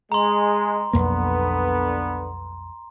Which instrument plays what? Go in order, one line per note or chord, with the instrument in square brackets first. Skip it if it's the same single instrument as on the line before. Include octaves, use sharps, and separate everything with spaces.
[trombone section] G#3 [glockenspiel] A#5 C6
[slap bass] B1 F2 A#3 [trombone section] D3 B3